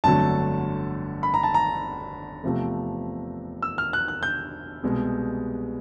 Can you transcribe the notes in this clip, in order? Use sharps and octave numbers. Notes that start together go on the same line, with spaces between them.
G1 F2 D3 F#3 A3 A5
B5
A#5
A5
A#5
E2 C3 F3 A3
E6
F6
F#6
F#6
G6
C2 B2 G#3